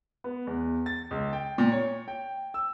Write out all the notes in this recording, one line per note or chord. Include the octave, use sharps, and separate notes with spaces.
B3
E2
A6
C#2
G5
A#2
C#5
G5
E6